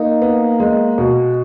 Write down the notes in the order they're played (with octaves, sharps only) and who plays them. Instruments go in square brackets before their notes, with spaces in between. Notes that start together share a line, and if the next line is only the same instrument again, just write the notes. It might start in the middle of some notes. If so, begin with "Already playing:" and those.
Already playing: [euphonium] A#3 [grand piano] D#4
[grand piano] B3
G#3
B2